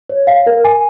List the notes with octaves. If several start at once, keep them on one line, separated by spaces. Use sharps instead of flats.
C#5
F5
A#4
G#5